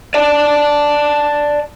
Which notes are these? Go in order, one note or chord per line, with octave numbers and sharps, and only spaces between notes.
D5 A5